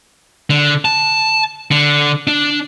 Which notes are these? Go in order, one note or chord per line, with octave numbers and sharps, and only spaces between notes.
D3
A5
D3
D4